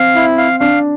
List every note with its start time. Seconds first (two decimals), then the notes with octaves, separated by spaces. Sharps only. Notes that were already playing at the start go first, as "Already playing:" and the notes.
Already playing: C4 F5
0.15 E4
0.38 F5
0.60 D4 F5